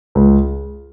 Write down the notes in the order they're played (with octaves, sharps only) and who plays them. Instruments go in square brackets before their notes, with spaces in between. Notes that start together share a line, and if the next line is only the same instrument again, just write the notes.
[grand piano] C#2